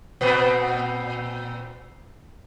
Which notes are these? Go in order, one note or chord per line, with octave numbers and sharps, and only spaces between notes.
A#2 B3 C4